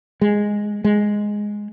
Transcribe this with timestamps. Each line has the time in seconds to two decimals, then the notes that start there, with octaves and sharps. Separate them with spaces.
0.21 G#3
0.84 G#3